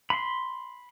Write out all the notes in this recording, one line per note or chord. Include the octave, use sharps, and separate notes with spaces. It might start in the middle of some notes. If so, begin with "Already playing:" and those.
B5 C6